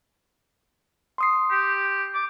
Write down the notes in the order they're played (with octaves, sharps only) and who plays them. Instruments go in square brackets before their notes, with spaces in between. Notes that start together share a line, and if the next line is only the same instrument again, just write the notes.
[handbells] C6 D#6 C7
[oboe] G4
D6